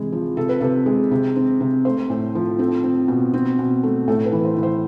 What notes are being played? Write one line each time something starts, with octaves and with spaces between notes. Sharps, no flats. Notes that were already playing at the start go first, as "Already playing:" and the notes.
Already playing: C3 E3 G#3
F3
C3 A4
B4
C3 A4
G#3
C3
C4
C3
A3 C5
A2
F3
C4 A4
C4
B2
C4
B2
A3
A2 A4
B4
E3
C5
E3
C5